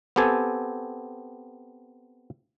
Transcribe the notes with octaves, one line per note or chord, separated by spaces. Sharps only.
B3 C4 G4 A4 G#5